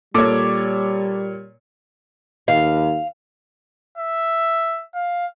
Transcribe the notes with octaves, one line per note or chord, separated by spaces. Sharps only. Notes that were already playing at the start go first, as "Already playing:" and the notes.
A#2 G3 A4 C#5 D6
D#2 F5
E5
F5